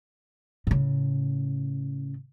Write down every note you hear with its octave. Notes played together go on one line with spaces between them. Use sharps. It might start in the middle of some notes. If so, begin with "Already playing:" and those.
A2 C#3